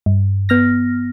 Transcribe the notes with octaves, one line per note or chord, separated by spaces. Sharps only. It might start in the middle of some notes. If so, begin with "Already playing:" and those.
G2
B3 F6 A#6